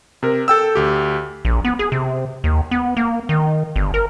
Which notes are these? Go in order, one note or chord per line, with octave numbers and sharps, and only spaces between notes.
C3 A#4
A4 G5 E6
D2 G4
A#1
B3
G#4
C3
D#2
B3
A#3
D#3
G1
A#4